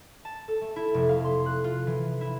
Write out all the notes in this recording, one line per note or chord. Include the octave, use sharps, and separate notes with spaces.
A5
A4
A3
E4
F1
F5
C6
F#6
F4
E3
E4